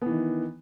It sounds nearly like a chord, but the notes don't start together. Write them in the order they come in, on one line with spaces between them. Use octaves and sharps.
B3 E3 D#3